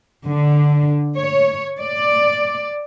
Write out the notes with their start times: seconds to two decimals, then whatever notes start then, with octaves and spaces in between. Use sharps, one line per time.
0.27 D3
1.16 C#5
1.79 D5